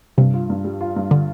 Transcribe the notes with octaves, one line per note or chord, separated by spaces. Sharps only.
G2 C3
F4
G2
G3
F4
G2
D3